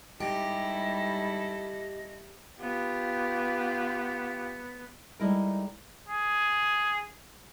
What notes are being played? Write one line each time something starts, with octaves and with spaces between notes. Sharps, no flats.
G#2 G3 E4 G4 A4 D#5
B3 F4 G4
G3 G#3 D#4 E4 A4 A#4
G#4